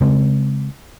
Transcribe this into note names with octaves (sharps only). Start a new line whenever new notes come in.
C#3 G#3 C4